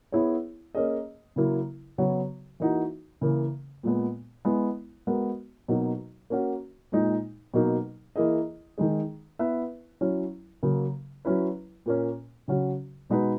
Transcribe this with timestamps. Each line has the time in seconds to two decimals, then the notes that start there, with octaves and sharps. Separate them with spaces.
0.12 B3 E4 G#4 C#5
0.75 A#3 C#4 G#4 D#5
1.36 C#3 F#3 A#3 E4
1.98 C#3 F#3 B3 F#4 C#5
2.60 E3 A#3 D#4 F#4
3.21 C#3 E3 A#3
3.83 A#2 G#3 B3
4.45 G#3 B3 E4
5.07 G#3 B3 F#4 A#4
5.68 B2 F#3 A#3 D#4 F#4
6.30 A#3 C#4 F#4
6.92 A#2 G#3 D#4
7.54 B2 F#3 A#3 D#4
8.16 E3 A#3 E4 G#4 D#5
8.78 D#3 G#3 D#4 G#4
9.39 B3 E4 B4 E5
10.01 F#3 C#4 E4
10.63 C#3 F#3 A#3
11.25 F#3 C#4 E4 B4
11.86 A#2 A#3 C#4
12.48 C#3 F#3 C#4 F#4
13.10 B2 G#3 D#4 F#4 B4